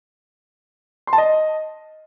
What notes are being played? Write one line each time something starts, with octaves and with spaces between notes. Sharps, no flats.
C6
A5
D#5